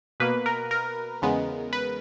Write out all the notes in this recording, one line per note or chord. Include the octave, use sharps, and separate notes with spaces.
B2 A#3 B4
A#4
A#4
E2 C#3 G#3 B3
B4